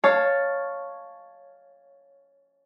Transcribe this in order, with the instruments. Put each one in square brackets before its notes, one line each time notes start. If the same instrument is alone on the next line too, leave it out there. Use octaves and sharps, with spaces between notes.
[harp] C#5 F5 A5